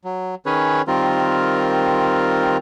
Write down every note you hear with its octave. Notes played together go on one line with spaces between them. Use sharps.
F#3
D#3 C#4 G#4 B4 C#5
D#3 G3 C4 F4 A#4